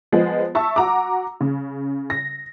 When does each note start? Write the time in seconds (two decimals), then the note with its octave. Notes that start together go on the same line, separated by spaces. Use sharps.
0.12 F3 G#3 B3
0.55 E5 A5 C#6 E6
0.76 F#4 A#5 D6
1.41 C#3
2.10 A#6